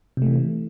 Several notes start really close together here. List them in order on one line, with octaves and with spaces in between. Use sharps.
C3 A3 E3